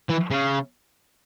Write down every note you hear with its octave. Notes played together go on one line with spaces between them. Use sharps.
E3
C#3